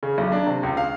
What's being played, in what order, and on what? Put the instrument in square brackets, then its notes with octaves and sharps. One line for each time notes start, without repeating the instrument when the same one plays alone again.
[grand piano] C#3
B1
D4
C3
C#2
F5